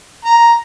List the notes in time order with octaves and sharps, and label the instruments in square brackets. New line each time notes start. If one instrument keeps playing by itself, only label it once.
[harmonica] A#5